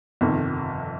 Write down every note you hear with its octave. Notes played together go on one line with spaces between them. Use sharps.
G1 F2 C3 D#3